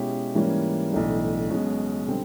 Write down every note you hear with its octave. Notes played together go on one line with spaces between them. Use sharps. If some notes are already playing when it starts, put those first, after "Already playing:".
Already playing: B2 G#3 C#4 E4 G4
G#2 E3 G3 A#3 C#4
B1 A2 E3 A3 D4
B1 B2 G#3 C#4
D3 G3 C4